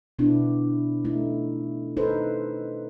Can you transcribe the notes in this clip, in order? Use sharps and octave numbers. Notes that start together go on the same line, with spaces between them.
B2 B3 D4 E4
A3 D#4 E4
D#4 A4 B4 C5